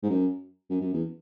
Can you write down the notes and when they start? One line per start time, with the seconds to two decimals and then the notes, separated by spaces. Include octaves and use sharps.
0.03 G#2
0.09 F#2
0.70 F#2
0.81 F#2
0.93 E2